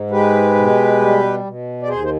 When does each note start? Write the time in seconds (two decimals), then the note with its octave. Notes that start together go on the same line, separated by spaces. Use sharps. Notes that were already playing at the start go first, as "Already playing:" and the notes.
Already playing: G#2
0.10 G#3 G4 B4
0.55 B2
1.00 G3
1.44 B2
1.82 D5
1.88 D#2 G#4 C5
2.04 C5